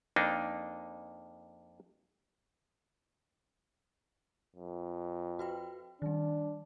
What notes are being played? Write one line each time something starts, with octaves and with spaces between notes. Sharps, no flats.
F2 A#3 D4 D#4
F2
F#4 B4 G5
D#3 G3 D4